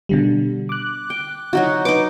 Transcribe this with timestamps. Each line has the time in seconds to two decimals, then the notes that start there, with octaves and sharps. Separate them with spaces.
0.09 B2 D3 G3
0.69 D6 F#6
1.10 G5
1.53 F#3 D#4 F#4
1.85 D#4 B4 D6